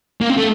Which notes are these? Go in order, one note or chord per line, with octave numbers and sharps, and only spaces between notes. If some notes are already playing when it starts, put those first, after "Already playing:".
A#3
C4
A3